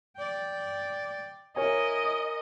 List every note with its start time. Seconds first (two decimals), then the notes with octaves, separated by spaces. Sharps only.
0.16 D5 G5
1.56 E4 A#4 C#5 D#5 G#5